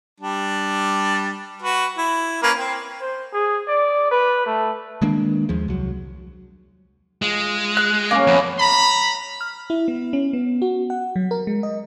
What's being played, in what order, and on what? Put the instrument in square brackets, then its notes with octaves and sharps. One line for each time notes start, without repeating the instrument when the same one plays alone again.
[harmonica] G3 D4
F#4 B4
E4
A#3 C#4 B4
C4
[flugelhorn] C5
G#4
D5
B4
A3
[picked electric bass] D#3 G#3 A#3 D4
D#2 F3 G#3
C2 F#3
[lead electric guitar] G#3 [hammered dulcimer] F4
[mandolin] F#6
[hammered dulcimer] C#3 C#4 [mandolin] A#3
[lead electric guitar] F2 [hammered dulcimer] B3 C#4 E4
[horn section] A#5 B5
[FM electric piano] F6
E4
B3
C#4
B3
F#4
F#5
F#3
A#4
G#3
D#5